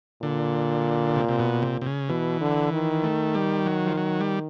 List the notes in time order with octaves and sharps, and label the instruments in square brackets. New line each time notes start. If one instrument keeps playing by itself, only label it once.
[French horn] A#2 [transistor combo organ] D3
[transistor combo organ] C3
C3
B2
C3
C3
C#3
[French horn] B2 [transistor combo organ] E3
[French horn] D3
D#3
[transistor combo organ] A3
G3
F#3
F3
F#3
G3